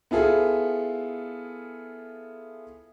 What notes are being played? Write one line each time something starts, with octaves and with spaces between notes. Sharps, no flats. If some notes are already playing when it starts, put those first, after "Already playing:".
B3 E4 F4 G#4 A4